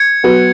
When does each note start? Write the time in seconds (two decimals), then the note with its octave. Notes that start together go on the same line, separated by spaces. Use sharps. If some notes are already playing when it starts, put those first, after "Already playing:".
Already playing: G#6 C#7
0.23 F#3 B3 F#4 B4